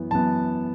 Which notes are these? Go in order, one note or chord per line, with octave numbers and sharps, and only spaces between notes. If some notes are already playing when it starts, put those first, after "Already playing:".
Already playing: F#2 E3 B3
F#2 E3 B3 A5